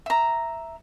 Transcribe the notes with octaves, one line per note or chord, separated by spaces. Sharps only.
E5 A#5